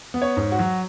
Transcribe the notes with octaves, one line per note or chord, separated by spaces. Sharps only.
B3
C#5
G#2
F#4
F#3